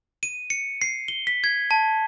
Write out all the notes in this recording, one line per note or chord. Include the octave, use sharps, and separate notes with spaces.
D#7
C#7
C7
G7
B6
G#6
A5